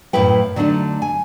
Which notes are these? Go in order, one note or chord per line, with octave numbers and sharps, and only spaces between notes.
F#2 A2 A#3 E4 B4 G5
D3 F#3 A3 D4 D#4
G#5